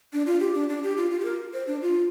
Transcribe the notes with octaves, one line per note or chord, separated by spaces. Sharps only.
D4
F4
G4
D4
D4
G4
F4
F4
G4
A#4
C5
D4
F4